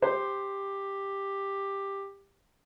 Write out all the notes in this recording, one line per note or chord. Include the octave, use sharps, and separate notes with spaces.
G4 C5